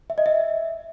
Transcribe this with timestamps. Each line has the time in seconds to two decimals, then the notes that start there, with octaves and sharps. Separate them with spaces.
0.10 E5
0.18 D#5
0.26 E5